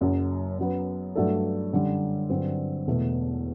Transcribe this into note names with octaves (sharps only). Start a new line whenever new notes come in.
F#1 F#2 F#3
F#2 F#3 B3
G2 F#3 A3 D4 A4
F#2 D3 G3
G2 D3 F#3 C4
E1 E2 B2 A3